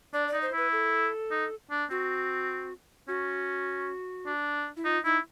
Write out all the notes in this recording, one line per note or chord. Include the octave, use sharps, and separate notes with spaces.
D4 D5
D5
D#4
C5
E4 B4
A4
D#4
D4
C4 F#4
C#4 F#4
D4
E4
D#4 F4
D#4 E4